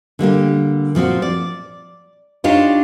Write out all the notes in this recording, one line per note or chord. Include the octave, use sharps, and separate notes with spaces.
D3 G3 A#3 G4
A#2 F3 C4 F#4
D5
D4 D#4 F4 G4 C#5